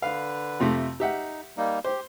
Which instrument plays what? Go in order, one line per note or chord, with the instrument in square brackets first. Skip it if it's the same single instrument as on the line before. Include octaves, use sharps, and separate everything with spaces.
[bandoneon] D3 B4 [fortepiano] F5
[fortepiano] F2 C3 A3
[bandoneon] D#4 [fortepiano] G4 E5 F#5
[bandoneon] G3 A#3 D#4
[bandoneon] G4 [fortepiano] C5